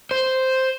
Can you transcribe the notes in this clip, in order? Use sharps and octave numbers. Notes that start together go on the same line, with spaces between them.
C5